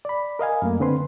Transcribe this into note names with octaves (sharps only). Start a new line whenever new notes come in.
D5 B5
A#4 D#5 F5 G#5
F#2 A3 A#3
D3 C4 B4 C6